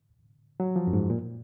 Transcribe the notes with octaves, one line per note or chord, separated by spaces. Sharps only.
F#3
F3
F#2
G#2
A#2